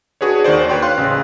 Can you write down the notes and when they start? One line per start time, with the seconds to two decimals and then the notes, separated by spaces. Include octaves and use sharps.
0.21 D4 F#4 G#4 B4 C#5
0.44 D#2 D#3 F#4 C5 D5
0.69 B4 C#5 G5 C6
0.82 F5 C6 F#6
0.98 A1 C#3